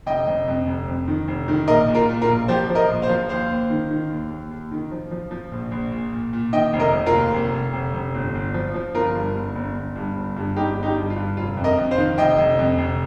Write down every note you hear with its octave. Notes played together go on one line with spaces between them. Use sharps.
F1 D#5 G5
F1
F2
F1
F2
D#3
F1
D#3
A#1 A#4 D#5
A#2
F4 A#4
A#2
F4 A#4
A#1
F3 G4 C5
F3
A#4 D#5
A#1
C5 F5
F3
D#2 C5 F5
D#2
D#3
D#3
D#2
D#2
D#2
D#3
F3
F3
F3
A#1
A#1
A#2
A#2
A#2
D#3 D#5 G5
F1
A#4 D#5
F1
F4 A#4
D#2
F1
F1
F1
F1
G1
G1
F3
F3
G1 F4 A#4
G2
G1
G1
G1
G2
G1
G2
G1 D#4 G4
G1
D#4 G4
G2
F4
G2
F1 F4
F2
A#4 D#5
F2
C5 F5
D#3
F1 D#5 G5
F1
F2
F1